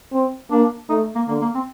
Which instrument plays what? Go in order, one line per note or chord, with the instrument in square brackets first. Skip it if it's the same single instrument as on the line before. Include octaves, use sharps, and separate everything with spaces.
[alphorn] C4
[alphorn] A#3 [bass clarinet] D4
[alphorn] A3 [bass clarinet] D#4
[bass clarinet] A#3
[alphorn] D3 [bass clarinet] A#3
[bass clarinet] A#3
C4